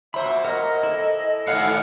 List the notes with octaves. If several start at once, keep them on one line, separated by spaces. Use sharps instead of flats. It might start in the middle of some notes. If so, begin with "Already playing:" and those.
A#2 F#4 C5 E5 B5
A#4 D#5 F#5 F6
E4 A4
G#2 B2 D#3 F5 F#5